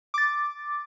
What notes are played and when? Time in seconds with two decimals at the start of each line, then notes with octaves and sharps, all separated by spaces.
0.14 D6 A6